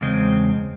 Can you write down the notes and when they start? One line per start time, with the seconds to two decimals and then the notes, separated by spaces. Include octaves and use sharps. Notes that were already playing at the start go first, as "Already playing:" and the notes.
0.01 E2 C#3 G#3 C4